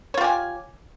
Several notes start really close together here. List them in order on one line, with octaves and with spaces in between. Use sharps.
C#5 F4 G4 G#5